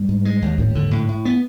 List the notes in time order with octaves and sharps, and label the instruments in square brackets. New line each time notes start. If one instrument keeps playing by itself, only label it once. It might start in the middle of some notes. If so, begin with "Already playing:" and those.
Already playing: [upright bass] G2
[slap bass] G#2
G#3
D#2
[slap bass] D#2 [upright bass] A2
[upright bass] G#2 [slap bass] D3
[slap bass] A2
A2
B3